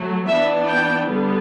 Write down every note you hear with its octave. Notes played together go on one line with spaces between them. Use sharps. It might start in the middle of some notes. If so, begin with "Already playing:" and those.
Already playing: F#3 A3
E3 B3 D4 E5
G5
D3 G3 B3 D4